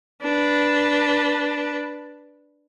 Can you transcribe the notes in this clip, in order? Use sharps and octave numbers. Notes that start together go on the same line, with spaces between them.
D4 B4